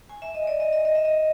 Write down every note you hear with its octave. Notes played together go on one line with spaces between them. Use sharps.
G#5
E5
D#5
D5
D#5
D#5
D#5
E5
D#5